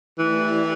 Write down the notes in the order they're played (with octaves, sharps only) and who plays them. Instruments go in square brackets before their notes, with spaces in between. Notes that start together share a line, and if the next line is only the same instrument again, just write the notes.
[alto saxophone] E3 [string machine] A3 E4 G4 D5